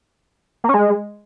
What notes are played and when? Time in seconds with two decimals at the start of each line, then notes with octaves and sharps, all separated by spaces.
0.64 A#3
0.69 C#4
0.74 G#3